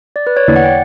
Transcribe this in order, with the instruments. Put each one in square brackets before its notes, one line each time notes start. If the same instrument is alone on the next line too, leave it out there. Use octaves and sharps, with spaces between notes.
[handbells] D5
B4
C#5
[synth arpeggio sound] E2 D3 A#3 E4 [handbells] D5
[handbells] F#5
G5